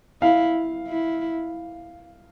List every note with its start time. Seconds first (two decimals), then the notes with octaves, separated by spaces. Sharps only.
0.22 E4 F5
0.87 E4